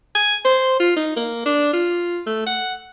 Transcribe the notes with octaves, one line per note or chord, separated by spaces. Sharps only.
G#5
C5
F4
D#4
A#3
D4
F4
A3
F#5